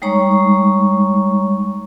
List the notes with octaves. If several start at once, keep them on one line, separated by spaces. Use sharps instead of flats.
G3 G#3 D#4 C#5 A#5 C#6